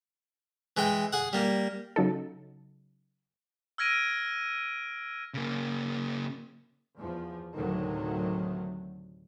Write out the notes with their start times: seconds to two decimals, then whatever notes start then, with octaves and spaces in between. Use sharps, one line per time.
0.77 E3 G#3 G5
1.13 G#4 F#5
1.33 G3 A#3
1.96 C#3 F#3 D#4 A4
3.78 E6 F6 G#6 A#6 D7 D#7
5.34 C#3 A#3
6.97 E2 F3
7.54 D2 A2 C3 D#3 F#3